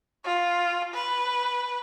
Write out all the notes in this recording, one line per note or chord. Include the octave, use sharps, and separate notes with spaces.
F4
B4